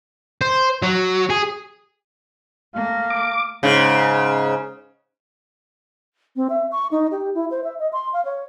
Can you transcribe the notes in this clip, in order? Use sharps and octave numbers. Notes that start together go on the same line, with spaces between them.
C5
F#3
G#4
A3 A#3 F5
D6
G#2 C#3
C4
E5
C#6
D#4
G4
E4
C5
E5
D#5
C6
F5
C#5